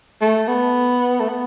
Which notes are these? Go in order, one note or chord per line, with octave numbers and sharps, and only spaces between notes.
A3
B3
A3
B3